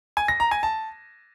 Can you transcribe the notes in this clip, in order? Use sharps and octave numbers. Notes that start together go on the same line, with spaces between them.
G#5
A#6
A#5
G#5
A5